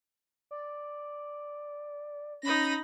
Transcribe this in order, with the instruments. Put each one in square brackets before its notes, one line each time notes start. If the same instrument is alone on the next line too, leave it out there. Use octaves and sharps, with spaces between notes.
[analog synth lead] D5
[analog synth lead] C#4 [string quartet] D#4 B5 A#6